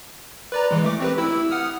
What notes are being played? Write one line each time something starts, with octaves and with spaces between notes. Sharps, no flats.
B4 D5 A#5
E3 G#3
A3 D6
C4 G4 B4
E4 E6
F#5 D#6 F6